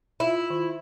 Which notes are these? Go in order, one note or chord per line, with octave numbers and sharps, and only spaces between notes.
E4 F4 E5
D#3